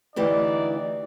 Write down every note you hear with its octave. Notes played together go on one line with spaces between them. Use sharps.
D2 E3 D#4 G4 D5